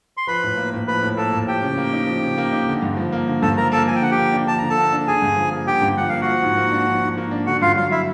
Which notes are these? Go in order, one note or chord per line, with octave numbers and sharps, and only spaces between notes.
C6
F3 B4 B5
A2
A#3
A2
F3 B4 B5
A2
A#3 A4 A5
A2
F3 G4 G5
C#3
A#3
D#4
F3
C#3
A#3
D#4
D3
G2
F3
A#3
D3
G2 A4 A5
F3 A#4 A#5
A#3 A4 A5
F3 G#5
G5
D3 F#5
G4 G5
A#3
D4
F3 A5
D3 A#5
A4 A5
A#3
D4
D3 G#4 G#5
G2
F3
A#3
D3 G4 G5
G2
F3 F#5
A#3 F5
F#4 F#5
F3
G#2
A#3
D4
F3
G#2
A#3
D4
D3 F#4 F#5
G2 F4 F5
F#3 F4 F5
E4 E5